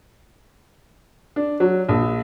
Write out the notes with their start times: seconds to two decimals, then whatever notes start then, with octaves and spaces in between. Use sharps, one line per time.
1.36 D4
1.60 F#3
1.89 A#1